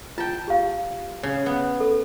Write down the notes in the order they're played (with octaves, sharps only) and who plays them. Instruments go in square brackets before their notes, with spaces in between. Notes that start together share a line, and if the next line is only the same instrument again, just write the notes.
[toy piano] F4 [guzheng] G5 A5
[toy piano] G4 F5
[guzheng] C#3
B3
[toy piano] A4